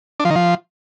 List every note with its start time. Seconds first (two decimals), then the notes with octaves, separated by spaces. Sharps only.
0.20 D4
0.25 F3
0.30 D#3
0.36 F3